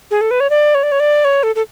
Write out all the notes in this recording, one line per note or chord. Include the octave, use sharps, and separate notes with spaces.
G#4
A4
B4
C#5
D5
C#5
D5
C#5
D5
C#5
A4
A4